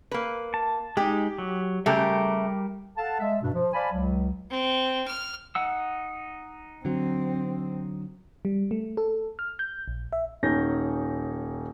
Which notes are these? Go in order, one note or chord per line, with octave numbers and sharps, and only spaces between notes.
A#3 B4
A5
G#3 D#4 G4
F#3
C#3 G3 A3 G4 A#4 G6
A4 F5 F#5 A5
G#3 E5
G2 B2 D4
F3
C5 D5 F5 G#5 A5 B5
C#2 F#3
C4
F6
D#4 F#5 E6
D3 F#3 C4
G3
A3
A4
F6
G6
A#1
E5
D#1 C#4 D#4 G6 A#6